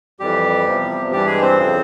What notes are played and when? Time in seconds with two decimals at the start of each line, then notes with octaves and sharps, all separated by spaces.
0.20 F2 E3 G3 G4
0.66 E2 C3 F3
1.12 G2 E3 G3 G4
1.26 G#3 G#4
1.42 C4 C5
1.58 F2 C#3 F3